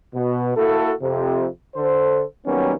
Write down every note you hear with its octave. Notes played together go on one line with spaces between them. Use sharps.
B2
A#3 E4 F#4 A4
F2 C3
D3 A4 C5
D#3 F#3 G3 A#3 B3 C#4